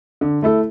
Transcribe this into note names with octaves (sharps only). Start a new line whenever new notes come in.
D3
A3 E4 A4